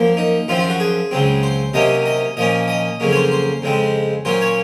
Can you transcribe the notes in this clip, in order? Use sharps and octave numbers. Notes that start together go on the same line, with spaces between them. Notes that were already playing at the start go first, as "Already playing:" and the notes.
Already playing: F#2 F3 A#3
D#4
F#2 F3 C4 F4
F4
F#4
G#4
C#2 C#3 F#3 C4
C5
C3 F#3 A#3 C#4 D#5
D#5
A#2 F3 A#3 C#4 D#5
D#5
F2 C#3 F#3 A#3 C#4
C#5
C5
C5
F2 C#3 G#3 C4
A#2 F#3 A#3 C#4 C5
C#5